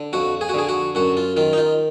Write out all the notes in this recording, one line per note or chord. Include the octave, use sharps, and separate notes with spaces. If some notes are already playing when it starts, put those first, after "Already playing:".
Already playing: D3
F2 F#4
G#4
F#4
D3 G#4
F#4
F#2 F#4
F4
D#3 F4
D#4
F4